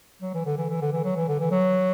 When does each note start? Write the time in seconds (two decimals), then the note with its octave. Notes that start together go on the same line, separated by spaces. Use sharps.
0.22 F#3
0.34 E3
0.45 D3
0.58 E3
0.70 E3
0.81 D3
0.92 E3
1.04 F#3
1.16 E3
1.28 D3
1.40 E3
1.51 F#3